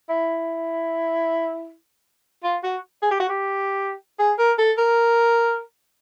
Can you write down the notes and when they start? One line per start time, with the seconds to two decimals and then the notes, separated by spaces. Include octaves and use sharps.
0.09 E4
2.43 F4
2.63 F#4
3.02 G#4
3.11 G4
3.20 F#4
3.29 G4
4.19 G#4
4.38 A#4
4.58 A4
4.78 A#4